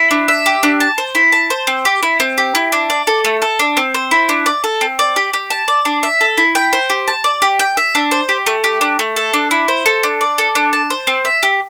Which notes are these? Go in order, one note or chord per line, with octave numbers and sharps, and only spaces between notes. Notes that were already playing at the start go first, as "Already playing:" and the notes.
Already playing: E4
D4
E5
G4
D4
A5
C5
E4
A5
C5
C4
G4
E4
C4
G4
E4
D4
D5
A4
A3
A4
D4
C4
C5
E4
D4
D5
A4
C4
D5
G4
G4
A5
D5
D4
E5
A4
E4
G5
C5
G4
A5
D5
G4
G5
E5
D4
C5
G4
A3
G4
D4
A3
A4
D4
E4
C5
A4
D4
D5
A4
D4
A5
C5
C4
E5
G4